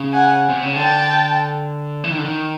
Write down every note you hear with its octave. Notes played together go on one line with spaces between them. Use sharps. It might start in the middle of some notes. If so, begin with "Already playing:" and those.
Already playing: C#3
F#5 G#5
C3
C#3
D3 G5 A5
E3
D#3
D3
D#3